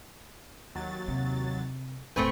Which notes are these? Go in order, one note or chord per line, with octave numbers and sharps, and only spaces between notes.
D#2 F#3 A6
C3
D#1 A2 A3 C4 B4 G5 G#5 C#6